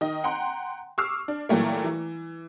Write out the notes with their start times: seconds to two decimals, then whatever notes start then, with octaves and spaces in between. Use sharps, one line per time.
0.01 D#3 D#5
0.24 F#5 G5 A#5 C6
0.98 C#6 D6 E6 F6 C7
1.28 D4
1.49 A#2 E3 F#3 G3 A3 A#3
1.84 E3